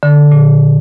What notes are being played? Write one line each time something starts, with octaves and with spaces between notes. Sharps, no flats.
D3
A#2